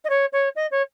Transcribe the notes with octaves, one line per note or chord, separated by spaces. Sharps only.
D#5
C#5
C#5
D#5
C#5